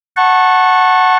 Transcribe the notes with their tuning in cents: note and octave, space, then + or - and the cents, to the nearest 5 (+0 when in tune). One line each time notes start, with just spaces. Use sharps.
F#5 +0 A5 +0 C#6 -25